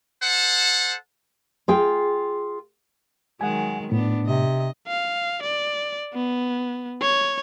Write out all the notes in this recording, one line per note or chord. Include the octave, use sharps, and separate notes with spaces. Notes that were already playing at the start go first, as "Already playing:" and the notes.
A4 C5 F#5
F4 G#4 G5
D#3 F#3 G#3 F#5 G#5
A2 B3 D4
C3 D#5
F5
D5
B3
C#5